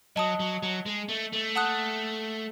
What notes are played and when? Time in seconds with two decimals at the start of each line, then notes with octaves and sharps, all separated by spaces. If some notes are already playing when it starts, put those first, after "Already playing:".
0.16 F#3 D#5 A5 D#6
0.40 F#3
0.63 F#3
0.86 G#3
1.09 A3
1.33 A3
1.56 F#5 A5 D#6 F#6